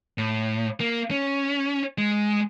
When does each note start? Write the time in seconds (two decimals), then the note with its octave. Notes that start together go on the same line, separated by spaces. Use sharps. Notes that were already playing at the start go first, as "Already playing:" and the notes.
0.18 A2
0.80 A#3
1.11 C#4
1.98 G#3